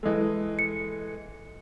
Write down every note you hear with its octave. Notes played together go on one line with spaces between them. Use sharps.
E3 G#3 A4 D#5
C#7